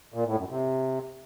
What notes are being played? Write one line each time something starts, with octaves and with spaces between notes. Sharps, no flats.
A#2
A2
F#2
C3